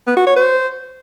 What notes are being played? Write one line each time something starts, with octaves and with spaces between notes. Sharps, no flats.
B3
F#4
C#5
C5